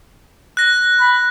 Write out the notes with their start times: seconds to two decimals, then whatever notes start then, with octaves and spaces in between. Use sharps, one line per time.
0.57 F#6 A#6
1.00 B5